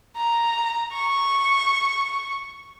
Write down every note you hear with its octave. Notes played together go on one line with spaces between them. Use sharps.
A#5
C#6